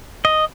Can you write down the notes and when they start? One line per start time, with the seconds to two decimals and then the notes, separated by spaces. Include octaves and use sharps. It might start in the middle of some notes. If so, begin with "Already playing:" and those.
0.25 D#5